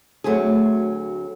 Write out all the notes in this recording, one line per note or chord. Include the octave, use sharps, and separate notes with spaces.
D2 F#3 A3 C4 G#4